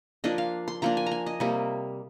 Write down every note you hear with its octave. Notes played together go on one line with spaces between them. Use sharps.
F3 A#3 D4 D#5
F5
C6
F3 A#3 D4 A#5
G#5
A#5
G#5
D#5
C3 G3 A#3